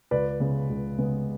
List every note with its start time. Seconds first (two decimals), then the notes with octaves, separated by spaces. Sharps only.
0.11 C#2 B4 D5
0.40 C#3 G#3 B3
0.69 C#2
0.98 C#3 G#3 B3